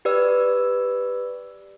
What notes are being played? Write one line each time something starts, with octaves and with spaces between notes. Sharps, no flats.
G4 B4 D5 E6